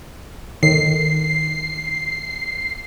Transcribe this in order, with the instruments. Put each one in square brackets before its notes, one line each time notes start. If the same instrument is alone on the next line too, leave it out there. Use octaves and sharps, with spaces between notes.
[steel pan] D#3 [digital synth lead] C7